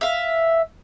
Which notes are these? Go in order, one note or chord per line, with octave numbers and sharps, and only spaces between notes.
E5 F5